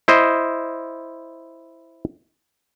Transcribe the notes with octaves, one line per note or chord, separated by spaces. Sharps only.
E4 C5 D#5